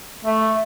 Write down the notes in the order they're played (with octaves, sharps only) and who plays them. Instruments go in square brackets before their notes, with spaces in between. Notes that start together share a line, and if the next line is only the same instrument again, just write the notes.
[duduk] A3